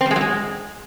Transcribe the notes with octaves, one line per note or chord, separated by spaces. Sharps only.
C4
G3
G#3
F#3
G#3